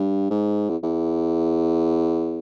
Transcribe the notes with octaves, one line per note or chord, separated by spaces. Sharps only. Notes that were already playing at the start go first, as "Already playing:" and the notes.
Already playing: G2
G#2
E2
E2